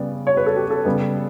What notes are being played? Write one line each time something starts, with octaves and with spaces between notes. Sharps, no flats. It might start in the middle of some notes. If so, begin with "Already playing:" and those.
Already playing: C#3 G3 B3 D5
C#5
B4
A4
G4
A4
C#3 G3 B3